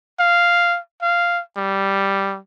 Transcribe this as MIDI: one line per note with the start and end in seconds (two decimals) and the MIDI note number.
0.19 0.79 77
1.02 1.41 77
1.57 2.38 55